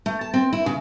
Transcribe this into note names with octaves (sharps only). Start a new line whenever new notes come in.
A3
A5
C4
E4
C#3